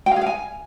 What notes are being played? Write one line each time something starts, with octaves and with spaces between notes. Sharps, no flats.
G5
F5
G#4
F5
G#5